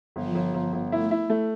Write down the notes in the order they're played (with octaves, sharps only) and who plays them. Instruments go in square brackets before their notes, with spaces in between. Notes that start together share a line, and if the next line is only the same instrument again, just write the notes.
[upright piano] G1 [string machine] F3
[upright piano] G1
G1
G1
[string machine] A3 [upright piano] E4
[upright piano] E4
A3